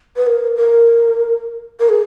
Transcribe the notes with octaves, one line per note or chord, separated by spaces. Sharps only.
B4
A#4
A#4
A#4
G#4